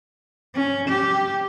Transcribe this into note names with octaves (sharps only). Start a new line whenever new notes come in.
C#4
G4